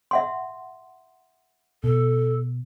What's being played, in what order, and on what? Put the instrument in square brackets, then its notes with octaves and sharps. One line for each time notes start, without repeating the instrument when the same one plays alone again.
[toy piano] E5 F#5 C6
[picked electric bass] B2 [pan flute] A4